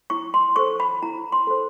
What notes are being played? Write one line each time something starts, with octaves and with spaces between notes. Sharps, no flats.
E4 C#6
C6
A4 C5 C#6
B5
E4 A#5
C6
A4 C5